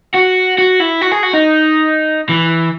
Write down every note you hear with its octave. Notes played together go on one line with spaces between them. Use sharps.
F#4
F#4
E4
F#4
G#4
F#4
D#4
E3